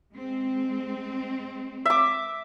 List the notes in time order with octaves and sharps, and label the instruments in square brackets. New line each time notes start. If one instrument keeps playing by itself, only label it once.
[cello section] G#3 C4
[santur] E5 D6